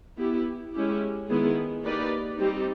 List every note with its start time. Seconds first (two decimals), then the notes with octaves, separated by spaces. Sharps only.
0.18 B3 E4 G4
0.74 G#3 C#4 E4 G4
1.29 D#3 G#3 B3 E4 G#4
1.84 A#3 D#4 G4 B4 D5
2.40 G3 C4 D#4 G4